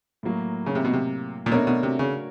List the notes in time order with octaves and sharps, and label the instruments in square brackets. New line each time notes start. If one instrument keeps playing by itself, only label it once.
[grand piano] A2 F#3 A#3
[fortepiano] C#3
C3
B2
C3
A#2
[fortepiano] B2 [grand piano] A3 D4 F#4 A#4 C#5
[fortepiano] B2
C3
C#3